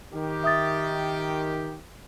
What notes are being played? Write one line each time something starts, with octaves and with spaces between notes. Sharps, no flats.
D#3 G4
E5 D#6 A6